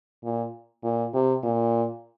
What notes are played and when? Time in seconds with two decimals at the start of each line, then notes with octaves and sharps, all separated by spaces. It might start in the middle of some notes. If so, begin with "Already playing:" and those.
0.24 A#2
0.84 A#2
1.14 C3
1.43 A#2